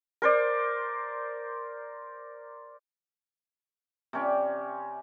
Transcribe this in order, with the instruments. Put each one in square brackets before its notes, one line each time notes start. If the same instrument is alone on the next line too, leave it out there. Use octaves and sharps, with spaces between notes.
[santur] A#4 C5 D5
[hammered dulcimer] C3 C#4 D5